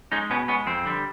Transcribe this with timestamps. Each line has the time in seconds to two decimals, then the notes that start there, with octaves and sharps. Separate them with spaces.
0.12 G#3 C#4 D#4
0.30 B2 B3 C#4
0.48 G#3 B3 C#4
0.66 F2 C4
0.85 D3 G3